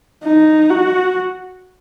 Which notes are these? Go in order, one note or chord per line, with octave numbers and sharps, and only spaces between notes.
D#4
F#4